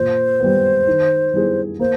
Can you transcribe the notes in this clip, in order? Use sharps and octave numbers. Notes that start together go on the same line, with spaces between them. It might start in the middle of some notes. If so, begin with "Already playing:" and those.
Already playing: A#2 C5
G3 B3
D#3
G3 B3 E4 G#4
A#3 C5